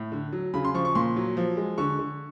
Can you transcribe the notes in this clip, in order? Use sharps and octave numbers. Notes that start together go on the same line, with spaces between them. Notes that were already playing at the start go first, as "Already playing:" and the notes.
Already playing: A2
D3
F#3
C#3 B5
C6
F3 C#6
C#6
A#2 C6
F#3
F3
G#3
D3 C#6
D3